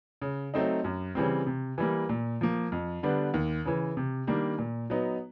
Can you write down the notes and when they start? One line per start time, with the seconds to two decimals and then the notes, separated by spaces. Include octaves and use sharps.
0.22 C#3
0.54 F#3 A3 C4 D#4
0.84 F#2
1.15 C#3 E3 G3 C4
1.47 C3
1.78 E3 G3 A#3
2.09 A#2
2.41 F3 A#3
2.72 F2
3.03 D3 G3 B3 D4
3.34 D#2
3.65 C#3 E3
3.97 C3
4.27 D#3 G3 A#3 D4
4.58 A#2
4.90 F#3 B3 D#4